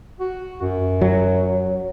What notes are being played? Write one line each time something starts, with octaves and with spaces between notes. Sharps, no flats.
F#4
F#2
F#3